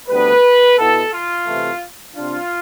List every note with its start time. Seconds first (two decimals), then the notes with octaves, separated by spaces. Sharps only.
0.09 D2 C3 G3 B3 D4 B4
0.77 B2 B3 E4 A4
1.11 F4
1.46 C3 E3 A3
2.14 C3 G3 D4 F4